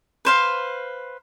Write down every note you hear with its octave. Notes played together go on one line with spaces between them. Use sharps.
B4 C5 F5